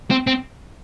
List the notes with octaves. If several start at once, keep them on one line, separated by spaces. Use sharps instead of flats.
C4
C4